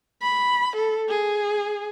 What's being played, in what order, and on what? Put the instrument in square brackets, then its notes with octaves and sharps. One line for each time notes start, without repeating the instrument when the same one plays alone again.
[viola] B5
A4
G#4